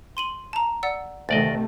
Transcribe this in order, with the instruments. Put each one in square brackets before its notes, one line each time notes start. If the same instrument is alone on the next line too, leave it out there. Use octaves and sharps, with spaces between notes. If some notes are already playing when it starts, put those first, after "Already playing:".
[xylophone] C6 D#7 F#7
A5 A#5
D5 F#5 E6
[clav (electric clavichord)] D2 D5 D#5 [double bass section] C3 D#3 A3 [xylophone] A6